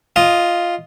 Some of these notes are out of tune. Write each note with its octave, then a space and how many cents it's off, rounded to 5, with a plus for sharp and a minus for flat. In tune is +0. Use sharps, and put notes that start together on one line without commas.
F4 +0 D#5 +0